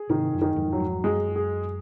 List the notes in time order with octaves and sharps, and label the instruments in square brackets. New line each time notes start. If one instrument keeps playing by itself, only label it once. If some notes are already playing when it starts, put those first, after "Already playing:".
Already playing: [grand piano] G#4
[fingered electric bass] G#2 C3 [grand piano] D#3
[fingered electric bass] F#2
[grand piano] D#3
[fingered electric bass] F2 G#2
[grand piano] F#3
[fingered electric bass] F2 G#2
[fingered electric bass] F#2 [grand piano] G#3
[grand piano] G#4